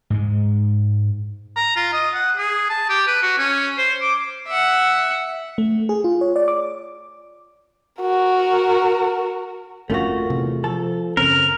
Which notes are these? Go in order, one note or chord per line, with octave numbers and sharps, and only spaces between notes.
G#2 G#3
A#5
F4
D#5
F#5
G#4
A5
G4
B4
F#4
C#4
C5
D6
E5 F#5
A3
G#4
F4
C#5
D5
D6
F#4 A#4
G1 F2 A3 C#4 F4 F#4 A#4
E2 C3
F3 A4
F#1 C#3 C4 C#4 A#4